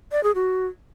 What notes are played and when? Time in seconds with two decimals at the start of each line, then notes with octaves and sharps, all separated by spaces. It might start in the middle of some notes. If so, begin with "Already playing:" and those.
0.12 D5
0.23 G#4
0.35 F#4